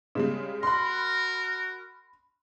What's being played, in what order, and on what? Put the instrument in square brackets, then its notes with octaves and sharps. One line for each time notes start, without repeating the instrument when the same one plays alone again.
[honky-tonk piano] C#3 G3 G#3
[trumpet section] F#4 A#4 [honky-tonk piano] B5 C6